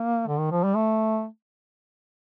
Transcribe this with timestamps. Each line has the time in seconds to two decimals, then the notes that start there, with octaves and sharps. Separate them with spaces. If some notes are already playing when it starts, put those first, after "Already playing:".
Already playing: A#3
0.27 D3
0.39 D#3
0.51 F3
0.64 G3
0.76 A3